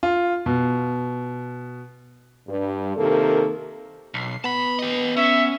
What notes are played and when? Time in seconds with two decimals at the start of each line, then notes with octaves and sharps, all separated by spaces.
0.03 F4
0.46 B2
2.49 G2
2.97 C3 D#3 A#3 A4
4.14 B1 C7
4.44 B3 A5 B5
4.79 G4 D#5
5.16 C#4 E5